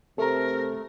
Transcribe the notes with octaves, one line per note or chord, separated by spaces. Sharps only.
C3 A3 A4 A#4 A#5